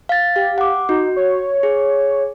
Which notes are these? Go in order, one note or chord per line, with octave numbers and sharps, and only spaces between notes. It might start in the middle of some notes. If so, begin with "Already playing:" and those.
F5 A6
G4 F5
F#5 D6
D#4 F#4
C#5
G#4